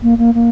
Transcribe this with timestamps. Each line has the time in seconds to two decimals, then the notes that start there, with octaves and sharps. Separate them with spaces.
0.03 A#3
0.18 A#3
0.34 A#3